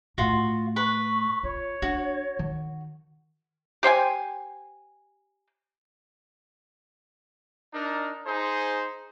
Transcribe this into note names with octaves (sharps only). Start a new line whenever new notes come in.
A2 A3 F4 F#4
B4 C#6
F4 C#5
D4 F#4
D#3
G4 C5 G5 G#5
D4 D#4 A#4
D#4 G#4 C5